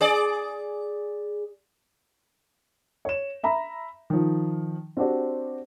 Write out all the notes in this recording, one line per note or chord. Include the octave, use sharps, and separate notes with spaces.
G#4 D5
C#5 E7
E5 A#5 B5
D#3 F3
C4 D4 F#4 G4 C5